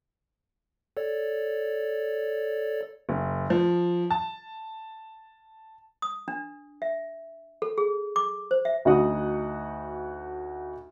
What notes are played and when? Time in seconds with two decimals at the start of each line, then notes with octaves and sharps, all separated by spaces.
0.97 A4 C#5 D5
3.09 F#1
3.50 F3
4.11 A5
6.02 D#6
6.28 D4
6.82 E5
7.62 A4
7.78 G#4
8.16 D6
8.51 C5
8.65 E5
8.85 D2 D#4 F#4 F#5 D#6